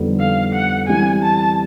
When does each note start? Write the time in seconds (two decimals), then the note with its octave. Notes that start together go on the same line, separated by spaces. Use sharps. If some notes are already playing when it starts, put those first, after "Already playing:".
Already playing: F2 D3 G3 B3 D#4
0.19 F5
0.53 F#5
0.87 E3 G3 C4 E4 G4 G#5
1.22 A5